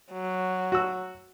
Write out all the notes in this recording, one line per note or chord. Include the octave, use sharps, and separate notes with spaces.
F#3
F#4 E6